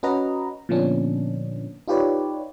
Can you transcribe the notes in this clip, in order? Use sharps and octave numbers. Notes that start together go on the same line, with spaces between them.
C#4 F#4 B4 D#5 A#5
A#2 D3 F3 B3 C#4 D4
D#4 F4 G4 B4 C#5 D5